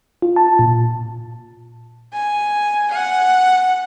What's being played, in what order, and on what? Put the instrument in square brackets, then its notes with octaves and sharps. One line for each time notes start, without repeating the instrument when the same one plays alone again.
[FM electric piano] F4
A5
A#2
[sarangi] G#5
F#5